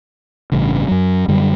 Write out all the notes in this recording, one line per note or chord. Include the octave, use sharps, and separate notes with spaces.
A1 G2 C#3
F#2 F#3
F#2 D3 G3